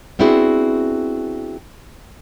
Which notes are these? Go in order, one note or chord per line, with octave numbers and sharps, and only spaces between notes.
B3 C4 D4 E4 F#4 G#4